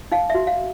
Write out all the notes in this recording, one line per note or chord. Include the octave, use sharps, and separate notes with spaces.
D#4 F5
F#4 E5
F5